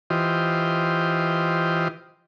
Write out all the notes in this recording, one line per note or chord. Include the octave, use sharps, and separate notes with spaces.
E3 F4 G4 C5 D#5